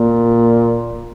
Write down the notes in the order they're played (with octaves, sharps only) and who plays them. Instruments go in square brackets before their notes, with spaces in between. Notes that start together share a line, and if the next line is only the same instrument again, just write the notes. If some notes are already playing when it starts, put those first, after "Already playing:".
Already playing: [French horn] A#2